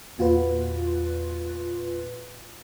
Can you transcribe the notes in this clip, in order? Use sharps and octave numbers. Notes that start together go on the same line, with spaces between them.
E2 A#2 F4 F#4 B4